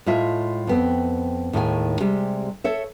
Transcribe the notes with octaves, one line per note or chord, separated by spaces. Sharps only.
A2 G#3 F4 E5
F2 B3 C4
D#2 A2 D#3 G#3 G5 G#5
C3 G3 G#3 G4
A4 C#5 E5